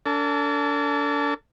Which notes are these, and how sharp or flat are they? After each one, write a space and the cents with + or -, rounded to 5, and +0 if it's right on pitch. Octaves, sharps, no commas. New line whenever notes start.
D4 -35 A4 +40 A5 -40